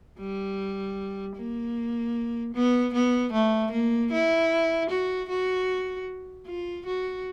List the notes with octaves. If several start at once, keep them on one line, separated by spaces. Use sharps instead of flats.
G3
A#3
B3
B3
A3
A#3
E4
F#4
F#4
F4
F#4